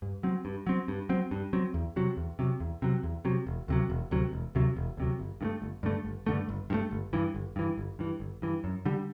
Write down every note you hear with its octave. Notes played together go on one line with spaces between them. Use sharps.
G2
F#3 C4
G2
F#3 C4
G2
F#3 C4
G2
F#3 C4
E2
C3 F#3
E2
C3 F#3
E2
C3 F#3
E2
C3 F#3
E1
D2 C3 F#3
E1
D2 C3 F#3
E1
D2 C3 F#3
E1
D2 C3 F#3
G1
G2 D3 A3
G1
G2 D3 A3
G1
G2 D3 A3
G1
G2 D3 A3
G1
G2 E3
G1
G2 E3
G1
G2 E3
G1
G2 E3
F#2
D3 G3